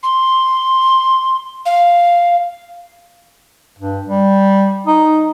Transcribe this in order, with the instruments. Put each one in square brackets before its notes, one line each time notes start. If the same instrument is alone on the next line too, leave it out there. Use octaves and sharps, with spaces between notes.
[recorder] C6
F5
[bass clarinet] G2
G3
D#4